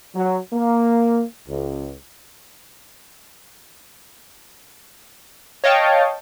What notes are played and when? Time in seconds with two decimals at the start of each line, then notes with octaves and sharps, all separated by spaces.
0.16 F#3
0.53 A#3
1.48 C#2
5.64 C#5 D#5 F5 G5 A5